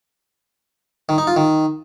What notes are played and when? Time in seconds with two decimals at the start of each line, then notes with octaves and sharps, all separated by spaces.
1.09 D#3
1.18 D#4
1.27 F4
1.36 D#3